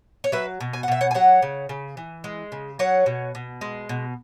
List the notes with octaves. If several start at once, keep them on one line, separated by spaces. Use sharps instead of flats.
C#5
F#3 B4 E5
B2
G#5
F#5
B2 E5
C#5 F#5
G#5
F#3 C#5 F#5
C#3
C#3
E3
G#3
C#3
F#3 C#5 F#5
B2
B2
G#3
B2